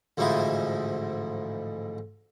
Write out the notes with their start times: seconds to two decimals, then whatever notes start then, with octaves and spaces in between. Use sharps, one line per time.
0.17 A1 D2 G#2 F3 D#4 E4